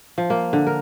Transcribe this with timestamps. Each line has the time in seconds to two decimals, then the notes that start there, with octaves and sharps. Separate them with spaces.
0.18 F3
0.30 A#3
0.53 D3
0.67 A#4